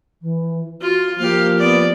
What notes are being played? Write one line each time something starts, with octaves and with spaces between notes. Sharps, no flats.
E3
F4 F#4
F3 A#3 G4 F5
B3 D5